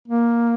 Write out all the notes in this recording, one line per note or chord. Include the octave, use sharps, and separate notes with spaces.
A#3